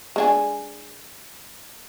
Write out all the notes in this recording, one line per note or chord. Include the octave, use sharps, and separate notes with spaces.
G#3 D4 G#5